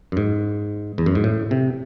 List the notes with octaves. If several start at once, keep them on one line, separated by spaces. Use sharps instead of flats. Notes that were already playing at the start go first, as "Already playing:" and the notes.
F#2
G#2
E2
F#2
G#2
A2
C3